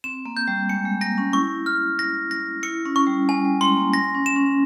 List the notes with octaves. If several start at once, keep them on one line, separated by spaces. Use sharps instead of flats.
C4 E7
A#3
G6
G3
G#3 C#7
G#3
A#3 A#6
C#4
E4 C#6
F6
A#6
A#6
E4 C#7
C#4
C#6
G3
G3 G#5
G3
G#3 C6
A#3
A#6
C#4
E7
C#4